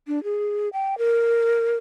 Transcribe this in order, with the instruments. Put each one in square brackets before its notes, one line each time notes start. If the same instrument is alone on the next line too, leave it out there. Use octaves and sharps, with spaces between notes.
[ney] D4
G#4
G5
A#4